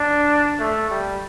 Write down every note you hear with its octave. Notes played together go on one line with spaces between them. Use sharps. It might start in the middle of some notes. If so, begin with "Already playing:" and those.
Already playing: D4
A3
G3